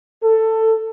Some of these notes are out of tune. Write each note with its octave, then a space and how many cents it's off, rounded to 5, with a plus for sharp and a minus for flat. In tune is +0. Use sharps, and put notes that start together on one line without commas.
A4 +15